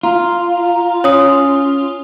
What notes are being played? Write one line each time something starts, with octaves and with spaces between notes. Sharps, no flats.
F4 A#5
C#4 C#5 D#6